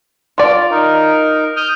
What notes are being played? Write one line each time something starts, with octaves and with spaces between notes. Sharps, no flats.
F4 D5
D#4 A#4
D#6 F6 G6